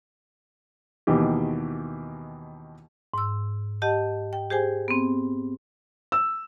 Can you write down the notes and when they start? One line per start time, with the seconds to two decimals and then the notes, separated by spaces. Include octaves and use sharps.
1.07 D#2 B2 D#3 E3 G4
3.14 G#2 E6
3.82 G4 D#5 F#5 A5
4.33 G5
4.50 G4 G#4 C5 G5 G#5
4.88 B3 C4
6.12 E6